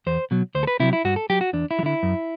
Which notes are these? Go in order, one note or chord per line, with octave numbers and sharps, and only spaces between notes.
E2 C5
B2 F#3
D2 C5
A4
B4
C3 F#3 E4
E4
G2 F#4
A4
F#3 G4
F#4
E2 D4
E4
F#3
D3 E4
F#2